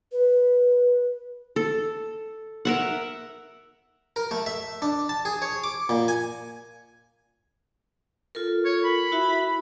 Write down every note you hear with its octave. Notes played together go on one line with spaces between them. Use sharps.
B4
A4
A#4 E5 F#5
A#4
A3
E5
D4
A5
G#4
C#5
D6
A#2
G#5
F4 A4 A#4
C#5
B5
E4 F#4 E5